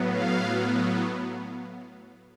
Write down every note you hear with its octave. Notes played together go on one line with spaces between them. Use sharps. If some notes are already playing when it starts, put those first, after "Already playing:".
Already playing: A2 F#3 B3
F5